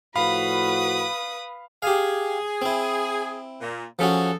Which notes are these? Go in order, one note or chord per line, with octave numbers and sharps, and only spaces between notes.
A2 F3 F#4 B4 F5 B5 D#6
G4 G#4 F5
C4 E4
A#2
E2 F3 C#4 F#4 G#4 A4